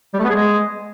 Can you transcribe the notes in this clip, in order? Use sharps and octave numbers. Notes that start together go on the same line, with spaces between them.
G3
A3
B3
G#4
G#3